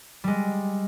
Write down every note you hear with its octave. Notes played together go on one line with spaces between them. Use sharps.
G3 G#3